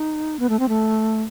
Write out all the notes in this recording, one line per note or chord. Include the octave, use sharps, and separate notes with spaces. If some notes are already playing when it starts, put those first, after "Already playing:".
Already playing: D#4
B3
A3
C4
A3